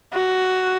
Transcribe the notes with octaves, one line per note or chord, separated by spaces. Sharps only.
F#4